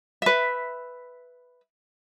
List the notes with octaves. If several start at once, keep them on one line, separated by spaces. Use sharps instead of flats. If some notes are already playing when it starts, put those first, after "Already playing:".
B4 E5